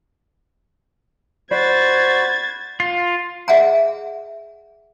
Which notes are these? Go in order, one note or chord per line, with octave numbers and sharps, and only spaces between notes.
F#4 C5 D5 B5 G#6 A6
F4
G#4 D#5 E5 F#5 G#5 A#5